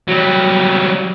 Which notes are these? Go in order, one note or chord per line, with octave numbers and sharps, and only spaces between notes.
F#3 G3